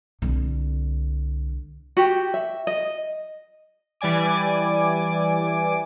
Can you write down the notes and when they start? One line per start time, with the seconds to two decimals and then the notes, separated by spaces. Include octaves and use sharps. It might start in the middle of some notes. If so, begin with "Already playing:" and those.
0.22 C2 D3
1.97 F#4 G4
2.34 E5
2.67 D#5
4.01 E3 G3 D5 G#5 D6